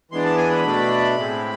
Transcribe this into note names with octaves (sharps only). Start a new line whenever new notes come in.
E3 G#3 B3 D4 C6
A5
G#5
B5
B2 A3 D4
A2 G#3 C4